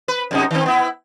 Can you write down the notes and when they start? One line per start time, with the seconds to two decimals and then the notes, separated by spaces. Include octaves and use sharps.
0.08 B4
0.31 F#2 C3 D#4
0.51 D#3 C4
0.66 B3 E4